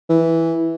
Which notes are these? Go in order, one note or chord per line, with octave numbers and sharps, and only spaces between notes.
E3